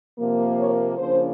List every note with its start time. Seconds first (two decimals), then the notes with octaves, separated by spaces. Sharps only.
0.19 C3 F3 A#3
0.58 C#5
0.98 C#3 F3 A#3 D4 C5